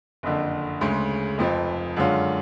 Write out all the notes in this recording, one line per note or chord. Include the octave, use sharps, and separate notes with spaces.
F#1 F2 D3
D2 C#3 G#3
F1 F2 F3
F#2 D3 G#3 C#4 F4